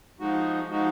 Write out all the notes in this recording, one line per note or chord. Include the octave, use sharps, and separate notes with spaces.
F3 G#3 D#4 F#4
F3 G#3 D#4 F#4